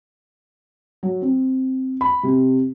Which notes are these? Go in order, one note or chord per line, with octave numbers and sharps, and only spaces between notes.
F#3
C4
B5
C3